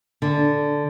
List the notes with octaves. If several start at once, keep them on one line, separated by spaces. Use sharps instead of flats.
D3